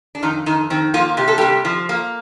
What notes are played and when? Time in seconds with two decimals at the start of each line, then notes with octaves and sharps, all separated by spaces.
0.15 D4
0.22 F2 D#3 D#4
0.46 F2 D#3 D#4
0.70 D#3 C4
0.94 F3 A#3 F4
1.17 C3 G4
1.28 A4
1.38 C3 G3 G4
1.65 F3
1.89 A#3